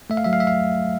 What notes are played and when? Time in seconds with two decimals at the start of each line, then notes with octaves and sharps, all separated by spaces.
0.10 A3 E5
0.17 F5
0.24 F#3 E5
0.33 F5
0.40 E5
0.47 F5